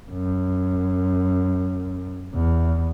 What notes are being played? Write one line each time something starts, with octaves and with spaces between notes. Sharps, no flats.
F#2
E2